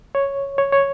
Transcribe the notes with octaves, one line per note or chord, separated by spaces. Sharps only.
C#5
C#5
C#5